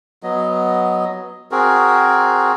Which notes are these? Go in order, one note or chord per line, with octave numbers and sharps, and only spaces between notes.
F#3 B3 D#5
C4 F#4 G#4 A#4